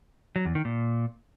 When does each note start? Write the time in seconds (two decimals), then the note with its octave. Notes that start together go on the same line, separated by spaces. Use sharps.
0.36 F#3
0.45 E2
0.55 D#3
0.65 A#2